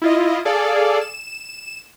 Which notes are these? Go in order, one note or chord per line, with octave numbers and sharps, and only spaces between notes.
E4 F4 D#5
G#4 A4 D5 F5
E7